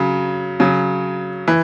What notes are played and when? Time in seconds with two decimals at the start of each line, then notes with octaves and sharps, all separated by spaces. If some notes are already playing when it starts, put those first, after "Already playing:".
Already playing: C#3 F#3
0.60 C#3 F#3
1.48 E3